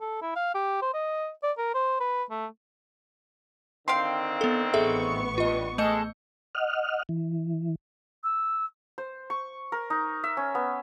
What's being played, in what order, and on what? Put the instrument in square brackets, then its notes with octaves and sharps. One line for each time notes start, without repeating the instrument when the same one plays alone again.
[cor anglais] A4
E4
F5
G4
C5
D#5
D5
A#4
C5
B4
A3
[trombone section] D3 D#3 C4 [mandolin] F5 G5 C6
[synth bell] B3 A4
[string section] A1 B3 C#6 [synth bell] G#4 A4 E5
[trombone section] G2 [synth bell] F4 D#5
[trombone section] G#3 [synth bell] A3 D#5 C#7 [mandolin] A4
[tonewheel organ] D#5 F#5 F6
E3
[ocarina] E6
[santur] C5
C#6
A#4
D#4
E5
C#4
B3